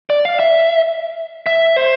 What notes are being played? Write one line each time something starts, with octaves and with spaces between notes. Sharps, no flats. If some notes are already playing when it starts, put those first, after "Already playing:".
D5
F5
E5
E5
C5